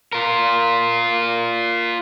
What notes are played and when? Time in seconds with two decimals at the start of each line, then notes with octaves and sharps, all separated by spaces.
0.12 F4 A#4